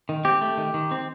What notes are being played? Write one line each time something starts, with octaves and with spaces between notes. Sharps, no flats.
D#3
C4 G4
A3
D#3
D#3
C4